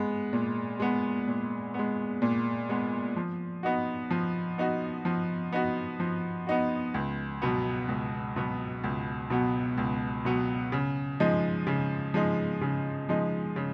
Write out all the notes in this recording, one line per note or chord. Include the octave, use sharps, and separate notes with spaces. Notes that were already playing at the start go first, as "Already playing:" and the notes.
Already playing: G#3 B3
A#2
G#3 B3
A#2
G#3 B3
A#2
G#3 B3
F3
B3 D#4 F#4
F3
B3 D#4 F#4
F3
B3 D#4 F#4
F3
B3 D#4 F#4
C#2
B2 F#3 B3
C#2
B2 F#3 B3
C#2
B2 F#3 B3
C#2
B2 F#3 B3
C#3
F3 G#3 D#4
C#3
F3 G#3 D#4
C#3
F3 G#3 D#4
C#3